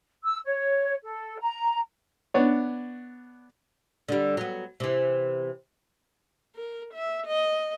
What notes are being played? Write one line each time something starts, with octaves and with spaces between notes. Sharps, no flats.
E6
C#5
A4
A#5
B3 D4 C#5
D3 G3
F#3 B3
C3 E3
A#4
E5
D#5